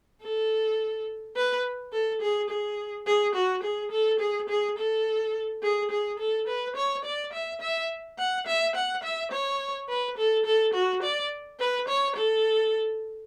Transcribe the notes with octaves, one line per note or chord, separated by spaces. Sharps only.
A4
B4
A4
G#4
G#4
G#4
F#4
G#4
A4
G#4
G#4
A4
G#4
G#4
A4
B4
C#5
D5
E5
E5
F#5
E5
F#5
E5
C#5
B4
A4
A4
F#4
D5
B4
C#5
A4